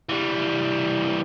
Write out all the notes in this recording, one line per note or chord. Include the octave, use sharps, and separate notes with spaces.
E3 G3